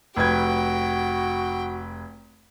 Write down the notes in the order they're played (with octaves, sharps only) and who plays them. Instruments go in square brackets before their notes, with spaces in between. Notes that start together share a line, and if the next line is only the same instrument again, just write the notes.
[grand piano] F1 B4 G#6 [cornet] F#4 [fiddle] G5